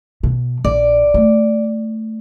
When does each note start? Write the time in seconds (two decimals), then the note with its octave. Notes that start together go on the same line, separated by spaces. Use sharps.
0.23 B2
0.64 A#1 D5
1.14 A3